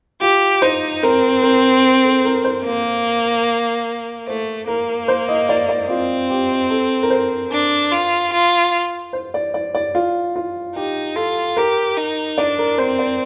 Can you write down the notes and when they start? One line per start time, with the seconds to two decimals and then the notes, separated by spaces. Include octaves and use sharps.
0.21 F4 G4
0.62 D#4 C5
1.03 C4 A#4
1.43 A#4
1.84 A#4
2.04 A4
2.25 A#4
2.44 C5
2.65 A#3
4.27 A3 C5
4.67 A#3 A#4
5.08 C5
5.29 D#5
5.49 D5
5.69 D5
5.89 C4 F4
6.30 G4
6.70 A4
7.03 A#4
7.10 C5
7.51 D4
7.92 F4
8.33 F4
9.13 C5
9.34 D5
9.54 D5
9.75 D5
9.95 F4
10.36 F4
10.76 D#4 G4
11.16 F4 A4
11.57 G4 A#4
11.97 D#4
12.38 D4 D5
12.58 A#4
12.78 C4 C5
12.99 D5